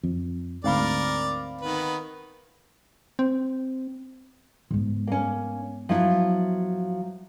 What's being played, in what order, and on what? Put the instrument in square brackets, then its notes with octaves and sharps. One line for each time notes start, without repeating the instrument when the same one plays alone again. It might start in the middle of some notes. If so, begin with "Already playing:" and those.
[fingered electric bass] F2
[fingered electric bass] D2 G#2 [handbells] C4 F5 B5 [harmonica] A#4 D5
[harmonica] D#3 B3 B4
[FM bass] C4
[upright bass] G#2 B3
[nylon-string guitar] A#3 C#4
F3 F#3 E4